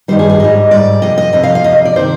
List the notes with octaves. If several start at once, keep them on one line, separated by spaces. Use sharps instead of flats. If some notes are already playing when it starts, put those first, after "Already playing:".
G2 D#3 G3 C5
G#4
G#4
G#2 G3 D#5
G#2 G3 D5
F2 C3 D#5
D#5
F2 C3 D#5
F5
F5
F2 C3 D#5
D5
C3 D#3 C5